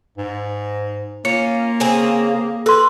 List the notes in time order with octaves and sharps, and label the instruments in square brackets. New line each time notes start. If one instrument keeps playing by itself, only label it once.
[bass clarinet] G#2
[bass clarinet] A#3 [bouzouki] C#4 F4 [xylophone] C#7
[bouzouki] C#3 C4 G#4
[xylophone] A4 C6 [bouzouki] B4